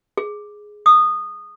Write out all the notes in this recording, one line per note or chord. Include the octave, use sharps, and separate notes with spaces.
G#4
D#6